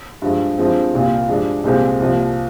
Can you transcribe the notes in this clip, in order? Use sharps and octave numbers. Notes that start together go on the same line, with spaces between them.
G2 F3 G#3
G2 F3 G#3 C4
C2 A#2 G3 A#3 F4
G2 F3 G#3 D4
C2 A#2 G#3 C4 G4
C2 C3 F3 A#3